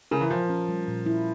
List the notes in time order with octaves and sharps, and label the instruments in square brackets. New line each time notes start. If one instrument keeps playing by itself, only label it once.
[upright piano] C#3 [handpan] A#4
[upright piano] E3
[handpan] A#2 [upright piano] F3
[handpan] C#4
G3
A#2
E4